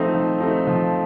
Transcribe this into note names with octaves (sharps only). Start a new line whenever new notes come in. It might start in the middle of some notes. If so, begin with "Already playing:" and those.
Already playing: F3 A3 C4 D#4
F3
A3 C4 D#4
F3